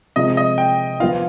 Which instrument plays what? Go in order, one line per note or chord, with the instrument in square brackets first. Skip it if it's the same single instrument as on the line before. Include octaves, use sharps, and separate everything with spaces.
[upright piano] C3 F3 G#3 [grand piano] D#5
[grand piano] D#5
G5
[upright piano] F3 B3 F4 [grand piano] F5